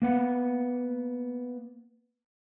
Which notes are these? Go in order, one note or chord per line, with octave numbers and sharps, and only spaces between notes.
A#3 B3 F#5